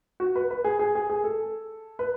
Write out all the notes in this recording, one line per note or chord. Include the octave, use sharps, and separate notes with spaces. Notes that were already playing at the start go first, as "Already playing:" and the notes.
F#4
B4
B4
G#4
G#4
G#4
G#4
A4
B4